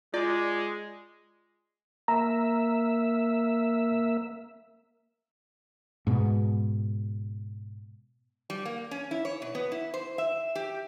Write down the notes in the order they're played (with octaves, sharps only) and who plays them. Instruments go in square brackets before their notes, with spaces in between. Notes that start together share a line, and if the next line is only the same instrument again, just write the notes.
[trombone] G#3 [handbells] F4 [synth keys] D5
[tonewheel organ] A#3 E5 [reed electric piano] A#5
[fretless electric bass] G#2 B2
[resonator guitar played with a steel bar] G3
A#3
C#4
E4
C#5
B2
B3
E4
C5
E5
G4